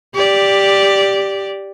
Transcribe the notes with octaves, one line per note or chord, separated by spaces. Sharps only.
G4 D5